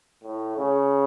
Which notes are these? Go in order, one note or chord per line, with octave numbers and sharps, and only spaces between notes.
A2
C#3